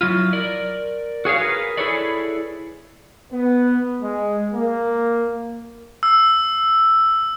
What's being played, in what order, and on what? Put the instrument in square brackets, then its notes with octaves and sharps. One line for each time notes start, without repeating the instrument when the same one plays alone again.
[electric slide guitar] F#3 E4 F4
A#4 D5
F#4 G#4 C#5 F5
G#4 A#4 B4
E4 G#4 A4 B4 C#5 D5
[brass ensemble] B3
G#3
A#3
[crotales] E6